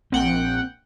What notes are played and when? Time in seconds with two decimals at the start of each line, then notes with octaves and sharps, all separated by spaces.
0.12 A#1 C4 F#5 G5